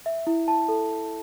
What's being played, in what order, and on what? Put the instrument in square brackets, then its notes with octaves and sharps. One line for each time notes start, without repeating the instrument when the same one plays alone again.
[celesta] E5
E4
A5
A4